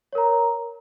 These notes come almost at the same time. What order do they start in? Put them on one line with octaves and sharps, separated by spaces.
C#5 A#4 A#5